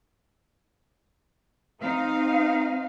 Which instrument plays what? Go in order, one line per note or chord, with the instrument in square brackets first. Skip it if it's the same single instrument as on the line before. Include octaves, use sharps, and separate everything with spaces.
[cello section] C4 D#4 F5